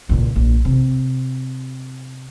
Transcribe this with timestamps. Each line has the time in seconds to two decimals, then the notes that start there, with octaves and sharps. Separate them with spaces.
0.09 C#2 A#2
0.36 A#1
0.65 C3